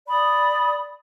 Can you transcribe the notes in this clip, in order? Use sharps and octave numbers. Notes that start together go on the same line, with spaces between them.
D5 B5 D#6